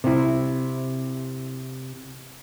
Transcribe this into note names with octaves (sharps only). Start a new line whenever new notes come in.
C3 E4